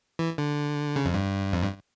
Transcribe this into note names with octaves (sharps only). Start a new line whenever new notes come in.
E3
D3
C#3
F2
G2
F2
G2